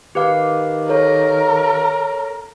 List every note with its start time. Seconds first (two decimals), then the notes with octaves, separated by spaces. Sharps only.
0.15 D#3 G4 B4 F5
0.89 A4 A#4 C#5